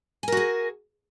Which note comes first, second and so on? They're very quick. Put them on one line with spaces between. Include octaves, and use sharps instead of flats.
G#5 A#4 F#4 G#4